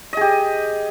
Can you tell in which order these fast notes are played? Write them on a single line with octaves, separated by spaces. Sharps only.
D#5 G#4 G4